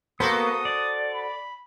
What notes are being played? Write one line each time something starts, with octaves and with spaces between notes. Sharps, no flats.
A#3 B3 F#4 A4 C5 D#6
D5
B5